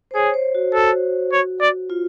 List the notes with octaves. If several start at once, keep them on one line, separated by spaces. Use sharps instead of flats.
C5
G#4 C#5
C5
F#4
F#4 A4
C#5
D5
F4